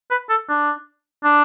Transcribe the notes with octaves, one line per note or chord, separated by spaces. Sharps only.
B4
A4
D4
D4